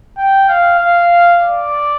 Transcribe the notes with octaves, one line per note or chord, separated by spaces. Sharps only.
G5
F5
F5
D5